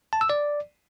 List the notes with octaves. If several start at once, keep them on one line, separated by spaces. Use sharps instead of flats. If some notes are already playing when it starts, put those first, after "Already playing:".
A5
E6
D5